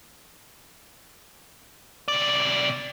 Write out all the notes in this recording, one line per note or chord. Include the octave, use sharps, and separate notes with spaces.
C3 D5